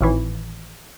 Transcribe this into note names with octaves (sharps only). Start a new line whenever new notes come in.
G#1 A2 E3